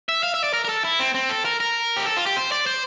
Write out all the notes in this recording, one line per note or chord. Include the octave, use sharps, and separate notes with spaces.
E5
F5
E5
D5
A#4
A#4
A4
E4
C4
C4
A4
A#4
A#4
G4
A4
F4
G4
C5
D5
C5